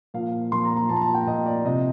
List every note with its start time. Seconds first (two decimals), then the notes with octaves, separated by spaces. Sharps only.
0.14 A#2 F3 F5
0.52 A#2 F3 C6
0.65 A#5
0.77 A#5
0.89 A#2 F3 A5
0.96 A#5
1.02 A5
1.14 G5
1.27 A#2 F3 D#5
1.46 D5
1.65 C3 F3 D#5